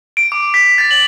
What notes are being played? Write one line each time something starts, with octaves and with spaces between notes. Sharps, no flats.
D7
D6
B6
A6
F#7